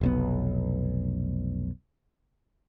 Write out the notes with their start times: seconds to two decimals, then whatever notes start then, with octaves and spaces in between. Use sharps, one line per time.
0.01 F1 B1 B3